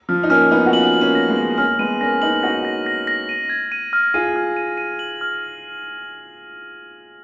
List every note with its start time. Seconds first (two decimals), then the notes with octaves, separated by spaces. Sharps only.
0.09 F3 F6
0.23 D#4
0.30 A#3 C#4 F6
0.51 B3 D#4 F6
0.66 F#4
0.72 C#4 F4 F#7
0.93 F#7
1.01 A#3 C#4
1.15 A#6
1.29 G#3 B3
1.36 F#7
1.58 A#3 C#4 F6
1.79 G#3 B3 D#7
2.01 A#3 C#4 A#6
2.22 B3 D#4 F#7
2.43 D#4 F#4 A#6
2.65 A#6
2.86 A#6
3.07 A#6
3.29 D#7
3.50 G#6
3.72 D#7
3.93 F6
4.14 F4 G#4 D#7
4.36 F6
4.57 D#7
4.78 D#7
4.99 F#7
5.21 F6